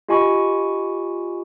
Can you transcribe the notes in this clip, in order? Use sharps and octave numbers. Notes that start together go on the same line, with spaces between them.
F4 G4 D#5 G#5 B5 C#6